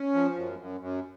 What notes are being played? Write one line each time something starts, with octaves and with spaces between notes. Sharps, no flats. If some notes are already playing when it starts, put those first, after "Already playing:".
Already playing: C#4
F3
F#2
F#2
F#2